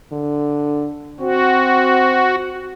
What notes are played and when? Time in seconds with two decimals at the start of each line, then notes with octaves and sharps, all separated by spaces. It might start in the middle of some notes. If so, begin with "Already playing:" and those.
0.13 D3
1.20 C4 F#4